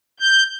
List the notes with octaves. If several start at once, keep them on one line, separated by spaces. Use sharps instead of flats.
G6